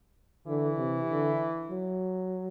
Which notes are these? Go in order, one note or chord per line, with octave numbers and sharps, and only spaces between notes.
D3 E3
C3
D3
F#3